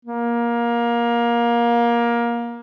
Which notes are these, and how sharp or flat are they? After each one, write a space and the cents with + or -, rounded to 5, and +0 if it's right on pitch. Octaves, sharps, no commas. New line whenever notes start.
A#3 +20